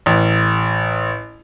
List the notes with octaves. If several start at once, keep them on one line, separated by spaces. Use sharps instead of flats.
A1